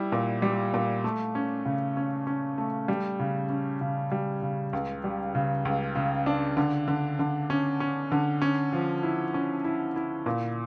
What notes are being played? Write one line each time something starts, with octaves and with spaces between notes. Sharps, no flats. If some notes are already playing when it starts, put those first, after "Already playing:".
Already playing: G3 E4
A#2
G3
A#2
A3
C#4
C#3
C#4
C#4
A3
G3
C#3
C#4
C#3
G3
C#3
C#2
G3
C#3
C#2
C#3
D4
D3
D3
D3
C#4
C#4
D3
C#4
F3
E4
C#4
E4
E4
A#2